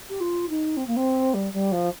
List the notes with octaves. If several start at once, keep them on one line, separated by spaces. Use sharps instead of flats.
G4
F4
D#4
C4
A#3
C4
G3
G3
F3